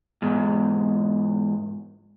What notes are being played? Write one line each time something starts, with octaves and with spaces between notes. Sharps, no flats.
E2 G#2